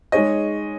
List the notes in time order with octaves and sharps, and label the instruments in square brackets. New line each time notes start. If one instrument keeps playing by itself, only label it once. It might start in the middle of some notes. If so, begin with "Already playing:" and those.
[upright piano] G#3 D#4 G#4 C#5 [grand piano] D#5